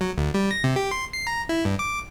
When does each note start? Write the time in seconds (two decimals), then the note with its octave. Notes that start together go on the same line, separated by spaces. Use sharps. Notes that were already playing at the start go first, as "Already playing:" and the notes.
0.01 F#3
0.18 D2
0.34 G3
0.51 A#6
0.64 C3
0.76 G4
0.91 C6
1.13 C7
1.27 A#5
1.49 E4
1.65 G2
1.79 D6